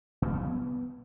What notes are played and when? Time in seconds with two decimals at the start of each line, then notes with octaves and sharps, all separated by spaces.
0.22 B2
0.30 G3
0.37 F3
0.45 B3